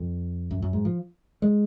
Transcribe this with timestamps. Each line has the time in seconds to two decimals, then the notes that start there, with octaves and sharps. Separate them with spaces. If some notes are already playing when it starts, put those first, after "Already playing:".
Already playing: F2
0.51 F#2
0.62 F#2
0.73 G#2
0.85 F3
1.42 G#3